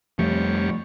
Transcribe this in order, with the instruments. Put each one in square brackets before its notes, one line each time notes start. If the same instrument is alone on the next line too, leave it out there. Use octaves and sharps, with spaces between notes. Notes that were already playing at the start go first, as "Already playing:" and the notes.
[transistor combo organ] F2 G3 C#5 [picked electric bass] F3 A3